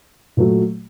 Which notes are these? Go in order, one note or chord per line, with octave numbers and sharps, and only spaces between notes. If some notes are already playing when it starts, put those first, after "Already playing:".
A#2 F#3 A3